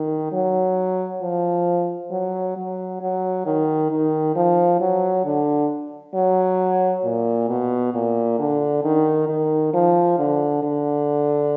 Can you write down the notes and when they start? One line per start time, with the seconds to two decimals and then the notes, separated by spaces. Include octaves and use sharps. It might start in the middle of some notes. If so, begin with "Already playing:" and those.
Already playing: D#3
0.32 F#3
1.22 F3
2.11 F#3
2.56 F#3
3.02 F#3
3.46 D#3
3.91 D#3
4.36 F3
4.80 F#3
5.25 D3
6.15 F#3
7.05 A#2
7.49 B2
7.94 A#2
8.39 D3
8.84 D#3
9.29 D#3
9.74 F3
10.19 D3
10.63 D3